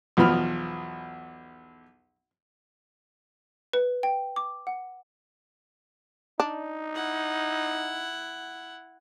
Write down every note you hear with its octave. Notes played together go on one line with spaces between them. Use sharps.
B1 E2 F3 B5 F6
B4
G5
D6
F#5
D4 D#4
E4 F#5